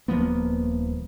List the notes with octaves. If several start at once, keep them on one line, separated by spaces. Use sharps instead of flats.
D#1 F3 A#3 B3